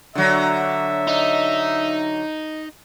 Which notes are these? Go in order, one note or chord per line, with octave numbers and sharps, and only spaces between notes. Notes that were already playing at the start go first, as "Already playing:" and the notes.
D3 F#3 E5
D#4